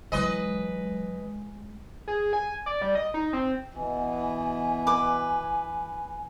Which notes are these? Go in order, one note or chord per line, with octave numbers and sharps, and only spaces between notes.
E3 F#3 G#3 B4 D#5
G#4
G#5
D5
G3
D#5
D#4
C4
B2 E3 G#5
B4 D6